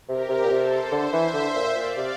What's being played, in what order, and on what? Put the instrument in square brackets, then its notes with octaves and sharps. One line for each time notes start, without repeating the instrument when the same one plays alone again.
[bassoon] C3 [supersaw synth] G4 A#4
[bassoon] C3
A#2
[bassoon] C3 [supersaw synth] A4 C5
[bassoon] D3 [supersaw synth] C5 E5
[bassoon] E3
D3
A#2
[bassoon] A#2 [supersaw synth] D5 F5
[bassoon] C3